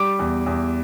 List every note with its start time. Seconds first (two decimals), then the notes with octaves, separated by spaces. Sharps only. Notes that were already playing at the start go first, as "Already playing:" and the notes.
Already playing: G3 D6
0.19 E2
0.46 E2